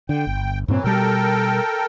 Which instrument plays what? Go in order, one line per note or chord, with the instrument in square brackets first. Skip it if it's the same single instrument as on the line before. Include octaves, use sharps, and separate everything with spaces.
[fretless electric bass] D3 [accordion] G5
[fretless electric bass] G1
[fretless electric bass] G2 A#2 C4 [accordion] E3 F#3
[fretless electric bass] B2 G3 [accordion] A4 A#4 G5